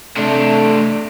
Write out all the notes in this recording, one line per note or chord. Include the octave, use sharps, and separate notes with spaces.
C3 A3 D4